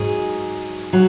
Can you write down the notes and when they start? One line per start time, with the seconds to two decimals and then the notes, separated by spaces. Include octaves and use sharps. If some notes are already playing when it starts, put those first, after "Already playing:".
Already playing: G#2 F#3 G#4
0.93 F#3